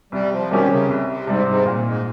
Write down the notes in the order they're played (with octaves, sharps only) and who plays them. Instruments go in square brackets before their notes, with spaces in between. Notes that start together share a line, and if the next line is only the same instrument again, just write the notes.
[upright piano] C2 [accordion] G3
[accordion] F3
[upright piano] C3 G3 C#4 G4 [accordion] D#3
[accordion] C#3
[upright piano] C2
[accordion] C3
[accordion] G#2 [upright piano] C3 G3 C4
[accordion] G#2
[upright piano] A#2
[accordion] G#2